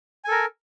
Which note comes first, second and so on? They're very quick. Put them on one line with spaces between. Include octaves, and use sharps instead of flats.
G#5 A4 A#4